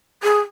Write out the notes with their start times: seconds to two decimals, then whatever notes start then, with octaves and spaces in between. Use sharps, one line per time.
0.23 G#4